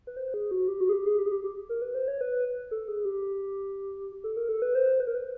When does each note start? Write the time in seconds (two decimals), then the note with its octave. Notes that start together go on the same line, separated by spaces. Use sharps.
0.07 B4
0.17 C5
0.34 G#4
0.51 F#4
0.68 G4
0.81 F#4
0.89 G#4
0.93 G4
1.06 G#4
1.19 G4
1.26 G#4
1.31 G4
1.44 G4
1.69 A#4
1.82 B4
1.95 C5
2.08 C#5
2.21 B4
2.71 A4
2.88 G#4
3.05 G4
4.24 A4
4.37 A#4
4.49 A4
4.62 B4
4.75 C5
5.00 B4
5.07 A#4
5.15 B4